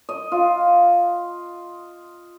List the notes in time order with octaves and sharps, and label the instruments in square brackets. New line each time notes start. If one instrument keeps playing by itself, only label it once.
[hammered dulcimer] D#5
F4